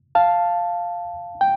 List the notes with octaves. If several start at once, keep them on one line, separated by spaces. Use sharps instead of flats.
F5 A5
G5